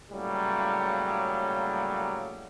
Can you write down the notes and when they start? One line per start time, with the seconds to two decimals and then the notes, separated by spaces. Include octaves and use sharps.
0.12 A2 C#3 F#3 G3 A#3